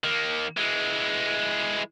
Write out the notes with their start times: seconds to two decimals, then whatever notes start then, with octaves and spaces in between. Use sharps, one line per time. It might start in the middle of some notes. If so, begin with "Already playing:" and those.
0.04 D#3 A#3
0.57 E3 G#3